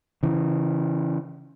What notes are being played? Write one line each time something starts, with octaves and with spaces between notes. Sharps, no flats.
C#3 E3